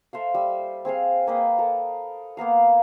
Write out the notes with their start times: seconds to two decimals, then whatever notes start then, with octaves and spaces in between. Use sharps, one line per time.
0.13 A4 C5 E5 F5
0.34 G3 E6
0.85 C4 G#4 C5 F5
1.27 A#3 B4 D#5 G5
1.59 A4 A#4
2.37 A#3 B3 A#4 F5